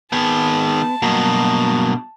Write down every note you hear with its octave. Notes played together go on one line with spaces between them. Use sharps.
D#3 B3 G#4 A5
G2 B2 F#3 A#3